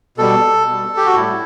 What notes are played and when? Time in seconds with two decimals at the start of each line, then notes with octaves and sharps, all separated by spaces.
0.18 B2 G3 A4
0.67 B2 G3
0.97 G4
1.06 F#4
1.15 A2 G3 E4